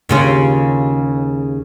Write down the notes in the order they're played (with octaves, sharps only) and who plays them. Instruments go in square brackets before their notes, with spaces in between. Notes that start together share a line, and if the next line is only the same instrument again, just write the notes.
[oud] D#2 C#3 F4